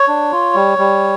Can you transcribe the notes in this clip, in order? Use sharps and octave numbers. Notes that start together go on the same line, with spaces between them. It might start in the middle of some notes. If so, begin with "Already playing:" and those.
Already playing: C#5
D4
F4
G3
G3